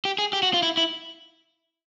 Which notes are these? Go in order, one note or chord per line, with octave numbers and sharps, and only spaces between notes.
G4
G#4
G4
F#4
F4
E4
E4